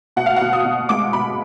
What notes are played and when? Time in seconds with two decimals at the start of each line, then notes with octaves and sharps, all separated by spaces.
0.16 B2 F#5
0.26 F5
0.36 B2 F#5
0.53 D#6
0.65 B2
0.89 G#3 D6
1.13 B2 B5